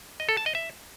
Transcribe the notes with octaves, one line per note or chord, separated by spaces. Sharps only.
D#5
A4
A5
D#5
E5